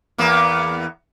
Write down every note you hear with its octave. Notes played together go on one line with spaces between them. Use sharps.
E2 A#3 B3